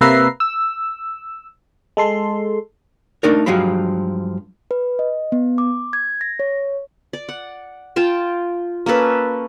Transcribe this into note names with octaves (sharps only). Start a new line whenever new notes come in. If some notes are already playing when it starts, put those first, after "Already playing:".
C3 A#3 B4 E5 A#5 C7
E6
G#3 A4 C6
A3 D4 D#4 A#4
G2 F3 F#3 G#3 F5 B5
B4
D#5
B3
D6
G#6
A#6
C#5
D5
F#5
F4 G5 A5
A#3 C#4 A4 B4